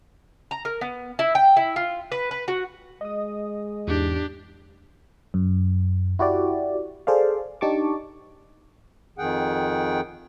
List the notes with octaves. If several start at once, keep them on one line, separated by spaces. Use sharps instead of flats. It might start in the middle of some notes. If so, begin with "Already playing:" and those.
A#5
A#4
B3
E4
G5
E4
F4
B4
B4
F#4
G#3 D#5 D#6
E2 G#2 D4 G4
F#2
E4 F#4 G4 D5
G#4 A4 C5 D5 F5
D4 D#4 G4 A5 C#6 D6
F2 D#3 G#4 F#5 G5